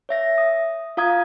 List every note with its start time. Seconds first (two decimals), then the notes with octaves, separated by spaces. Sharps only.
0.09 C#5 E5 A#6
0.38 D#6
0.97 F4 F5 A#5 D#6 G#6